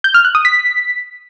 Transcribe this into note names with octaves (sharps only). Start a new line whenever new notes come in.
G6
F6
F#6
D#6
B6